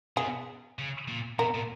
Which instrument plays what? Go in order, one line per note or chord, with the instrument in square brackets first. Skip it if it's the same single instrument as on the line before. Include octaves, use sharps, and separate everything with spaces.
[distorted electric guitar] B2 [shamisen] G#4
[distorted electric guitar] C#3
A#2
[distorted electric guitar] B2 [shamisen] A#4
[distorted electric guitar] A#2